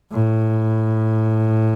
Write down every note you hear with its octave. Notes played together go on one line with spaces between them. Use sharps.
A2